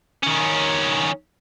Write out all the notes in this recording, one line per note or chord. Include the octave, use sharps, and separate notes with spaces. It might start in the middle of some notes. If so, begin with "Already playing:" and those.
D#3 C#4